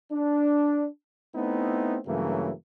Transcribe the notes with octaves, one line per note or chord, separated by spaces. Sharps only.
D4
A3 B3 C4 D#4 E4
G2 C#3 E3 F#3 A3 A#3